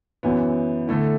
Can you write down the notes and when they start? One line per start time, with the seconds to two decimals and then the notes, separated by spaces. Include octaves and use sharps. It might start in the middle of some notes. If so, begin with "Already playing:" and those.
0.23 F#2 E3 B3
0.88 D3 A3 E4